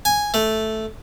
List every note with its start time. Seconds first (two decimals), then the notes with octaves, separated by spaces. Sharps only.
0.05 G#5
0.34 A3